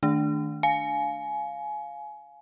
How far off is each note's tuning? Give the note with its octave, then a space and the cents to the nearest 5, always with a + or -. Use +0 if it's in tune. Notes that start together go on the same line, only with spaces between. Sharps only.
D#3 +0 A3 +0 D4 +0
F5 +0 G#5 +25